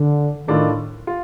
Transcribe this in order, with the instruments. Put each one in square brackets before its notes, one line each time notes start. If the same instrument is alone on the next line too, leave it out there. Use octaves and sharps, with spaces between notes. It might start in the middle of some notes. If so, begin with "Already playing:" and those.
Already playing: [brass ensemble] D3
[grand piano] A2 A3 D4 F4 [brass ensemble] D#3
[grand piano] F4